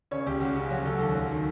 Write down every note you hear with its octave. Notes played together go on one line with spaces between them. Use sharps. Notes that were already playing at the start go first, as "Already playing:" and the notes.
C#3 C#5
C#2 G4
C#3 F#4
C#3 F#4
F#3 F#4
C#2 A4
D#2 A4
F#3
D#3